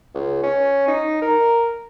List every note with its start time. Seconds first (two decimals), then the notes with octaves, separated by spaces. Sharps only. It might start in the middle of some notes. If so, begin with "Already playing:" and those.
0.14 C#2
0.43 C#4
0.88 D#4
1.22 A#4